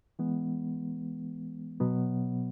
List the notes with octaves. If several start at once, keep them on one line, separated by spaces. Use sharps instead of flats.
E3 G#3 B3
B2 F#3 B3